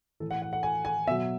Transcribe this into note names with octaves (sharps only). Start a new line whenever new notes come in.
A2 E3 A4
F#5
F#5
F#5
G#5
G#5
B2 F#3 E5